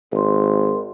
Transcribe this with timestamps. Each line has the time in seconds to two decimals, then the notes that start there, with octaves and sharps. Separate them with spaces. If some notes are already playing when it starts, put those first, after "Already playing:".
0.12 G#1 A#4 C6